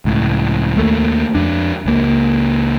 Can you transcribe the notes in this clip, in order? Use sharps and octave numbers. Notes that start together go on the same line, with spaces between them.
C#2 A2
D#2 A3 A#3
F2 D4
C#2 A#3